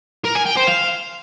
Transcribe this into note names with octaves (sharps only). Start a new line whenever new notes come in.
A#4
G#5
G5
C5
F5